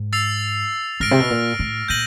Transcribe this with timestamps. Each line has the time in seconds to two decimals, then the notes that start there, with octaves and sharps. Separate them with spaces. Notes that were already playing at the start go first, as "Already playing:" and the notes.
Already playing: G#2
0.13 E6 A6 C7 F7
1.00 G#2 F6 A#6 D7
1.11 C3
1.20 B2
1.30 A#2
1.59 A2
1.88 A#2 G6 A#6 D#7 F#7